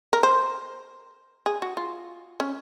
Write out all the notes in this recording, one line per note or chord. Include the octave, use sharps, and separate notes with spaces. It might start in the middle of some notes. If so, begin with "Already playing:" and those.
A#4
C5
G#4
F#4
F4
C#4